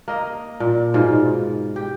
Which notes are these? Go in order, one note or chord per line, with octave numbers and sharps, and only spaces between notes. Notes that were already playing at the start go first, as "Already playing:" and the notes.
A#3 D#5
A#2
G#2 B2 F4
G4